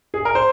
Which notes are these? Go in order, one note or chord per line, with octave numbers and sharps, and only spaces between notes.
G#4
A#4
C5